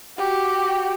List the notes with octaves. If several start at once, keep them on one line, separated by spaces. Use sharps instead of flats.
F#4 G4